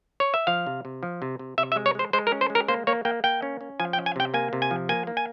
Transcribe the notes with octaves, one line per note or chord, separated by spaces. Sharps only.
C#5
E5
F3 F5
C3
C3
F3
C3
C3
C3 E5
E5
G#3
C#5
G#3 C5
G#3 C5
A#4
C#4
C5
G#3
A#4
A#3 C5
A#3 C#5
A#3 G5
A#3 G5
C#4
C#4
F3 G#5
G5
C#4
G#5
C3 G5
A#3 G#5
C3
G#5
F3
A#3 G#5
A#3
G#5